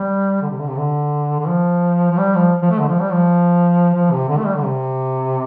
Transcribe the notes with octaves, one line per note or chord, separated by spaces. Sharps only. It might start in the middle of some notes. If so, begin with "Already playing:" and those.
Already playing: G3
D3
C3
D3
C3
D3
D3
F3
F3
G3
F3
F3
A3
D3
F3
G3
F3
F3
C3
D3
A3
G3
D3
C3